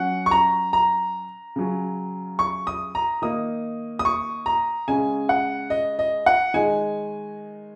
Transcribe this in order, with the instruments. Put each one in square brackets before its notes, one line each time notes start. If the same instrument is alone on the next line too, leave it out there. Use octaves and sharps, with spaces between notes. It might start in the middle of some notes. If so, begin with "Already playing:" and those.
Already playing: [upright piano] F#3 C#4 F#5
C#6
A#5
A#5
C#3 F#3 C#4
C#6
D#6
A#5
D#3 A#3 D#4 D#6
D#6
C#6
A#5
C#3 G#3 C#4 G#5
F#5
D#5
D#5
F#5
D#3 G#3 D#4 G#5